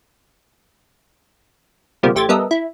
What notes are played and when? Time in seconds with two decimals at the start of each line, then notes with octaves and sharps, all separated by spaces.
2.03 C#2 B2 F3 G3 A#3 C4
2.15 A1 A3 G4 C5 G#6 A6
2.29 G3 B3 A4 A#4 D#5 E5
2.51 E4